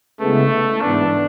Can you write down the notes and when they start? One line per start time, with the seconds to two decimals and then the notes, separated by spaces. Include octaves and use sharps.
0.20 C#3 G#3 A3 B3 E4
0.82 G#2 E3 B3 D4